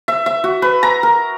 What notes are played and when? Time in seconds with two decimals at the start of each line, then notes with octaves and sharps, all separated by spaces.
0.08 E5
0.26 E5
0.44 F#4
0.62 B4
0.83 A#5
1.03 A#4